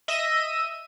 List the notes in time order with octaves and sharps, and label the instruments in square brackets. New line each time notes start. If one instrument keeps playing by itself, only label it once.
[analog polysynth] D#5 E5 D#7